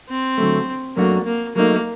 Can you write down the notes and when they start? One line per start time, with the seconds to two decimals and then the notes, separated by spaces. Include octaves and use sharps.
0.09 C4
0.38 D3 F#3 A3
0.96 F#2 F#3 A3 A#3 D4 F#4
1.26 A#3
1.56 F#3 A3 A#3 D#4